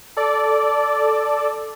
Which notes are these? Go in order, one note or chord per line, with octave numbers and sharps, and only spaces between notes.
A4 D5